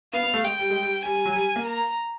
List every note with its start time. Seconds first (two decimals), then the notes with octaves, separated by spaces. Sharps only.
0.13 B3 F5
0.23 B3
0.34 A3
0.44 G#3 G5
0.59 G3
0.70 G#3
0.82 G3
1.05 G3 G#5
1.15 G3
1.25 F#3
1.35 G3
1.56 A#3
1.66 A#5